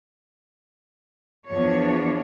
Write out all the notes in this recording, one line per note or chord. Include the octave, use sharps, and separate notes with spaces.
E2 F3 D4 C#5